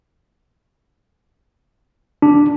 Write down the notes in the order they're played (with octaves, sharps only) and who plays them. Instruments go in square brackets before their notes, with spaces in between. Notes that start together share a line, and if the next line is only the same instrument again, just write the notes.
[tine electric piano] D4